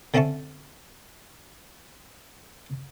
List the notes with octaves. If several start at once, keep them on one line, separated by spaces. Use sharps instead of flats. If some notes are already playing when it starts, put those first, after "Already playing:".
D3 C4 C#4 E5 A5 C#6